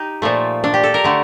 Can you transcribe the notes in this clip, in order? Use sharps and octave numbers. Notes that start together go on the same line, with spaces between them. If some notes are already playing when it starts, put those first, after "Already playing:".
Already playing: D#4 G4
A#2 F3 A3
D4
G4
A4
A#4
D3 A3